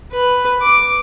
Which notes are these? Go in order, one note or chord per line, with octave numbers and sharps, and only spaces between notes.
B4
D6